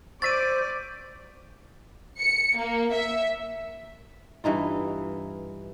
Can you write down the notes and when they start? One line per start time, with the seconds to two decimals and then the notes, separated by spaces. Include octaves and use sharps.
0.22 C5 D5 C#6 D6 E6 A6 B6 D#7
2.19 C#7
2.58 A#3
2.93 E5
4.44 G2 E3 D#4 F4